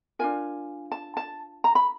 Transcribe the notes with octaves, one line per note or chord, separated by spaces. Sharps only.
D4 F4 A#4 G#5
A5
A5
A#5
B5